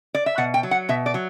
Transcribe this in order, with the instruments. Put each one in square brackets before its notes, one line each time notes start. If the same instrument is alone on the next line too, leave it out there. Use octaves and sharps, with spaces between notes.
[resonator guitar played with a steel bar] D5
E5
B2 F#5
G5
F#3
F#5
B2 E5
D5
F#3